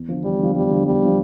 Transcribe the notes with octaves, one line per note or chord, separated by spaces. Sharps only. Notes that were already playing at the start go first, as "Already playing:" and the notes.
Already playing: E2
D3 F3
E2 G3
D3 F3
E2 G3
D3 F3
E2 G3
D3 F3